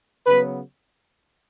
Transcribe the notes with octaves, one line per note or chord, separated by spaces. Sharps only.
C#3 F#3 B3 B4